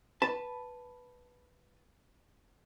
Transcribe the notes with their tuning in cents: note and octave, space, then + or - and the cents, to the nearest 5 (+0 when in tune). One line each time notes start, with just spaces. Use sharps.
B4 +0 A5 +0